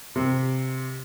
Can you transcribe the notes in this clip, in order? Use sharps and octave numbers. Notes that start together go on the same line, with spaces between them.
C3